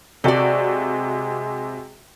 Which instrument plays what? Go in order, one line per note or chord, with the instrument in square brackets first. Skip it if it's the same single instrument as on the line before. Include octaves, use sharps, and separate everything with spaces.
[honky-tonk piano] C3 F#4 [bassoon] G#3 [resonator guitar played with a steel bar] A4 D5